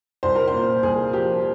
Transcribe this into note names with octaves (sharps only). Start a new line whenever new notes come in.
C2 C5
A#4
C5
A#2
C2 G#4
F3 G4